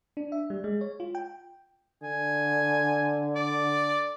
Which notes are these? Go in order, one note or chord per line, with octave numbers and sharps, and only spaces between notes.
D4
E5
G3
G#3
C#5
F4
G5
D3 G#5
D5